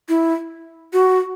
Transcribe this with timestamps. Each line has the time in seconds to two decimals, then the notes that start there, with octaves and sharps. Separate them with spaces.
0.09 E4
0.93 F#4